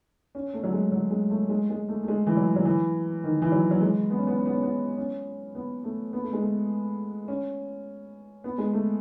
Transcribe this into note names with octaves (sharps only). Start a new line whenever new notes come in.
C#4
A3
F#3
G#3
F#3
G#3
A3
G#3
G#3
A3
A3
G#3
E3
F#3
F#3
E3
D#3
E3
F#3
F#3
G#3
B3
C#4
B3
C#4
B3
C#4
B3
C#4
B3
A3
B3
A3
G#3
A3
C#4
B3
G#3
A3